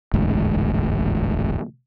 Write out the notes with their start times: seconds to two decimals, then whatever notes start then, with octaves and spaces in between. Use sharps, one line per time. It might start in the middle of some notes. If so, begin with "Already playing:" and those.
0.14 E1 A1 D2 G#2